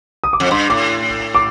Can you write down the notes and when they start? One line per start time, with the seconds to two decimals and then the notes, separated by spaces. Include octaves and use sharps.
0.24 D#6
0.33 D6
0.40 F2
0.51 G2 C6
0.70 A2 D6
1.35 D6